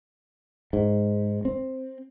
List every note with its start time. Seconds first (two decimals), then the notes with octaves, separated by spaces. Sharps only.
0.73 G#2
1.45 C4